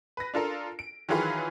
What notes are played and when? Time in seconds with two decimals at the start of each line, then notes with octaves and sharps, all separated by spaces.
0.17 B4 A#6
0.34 D4 F4 A4 A#4
0.79 D7
1.09 D#3 E3 F#3 F4 G#4 B4